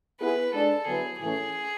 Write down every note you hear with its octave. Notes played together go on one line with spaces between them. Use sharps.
B3 E4 G#4 B4
G#3 D4 G#4 A4 D5
D3 F#3 B3 E4 G#4 B4
A2 E3 A3 C#4 G#4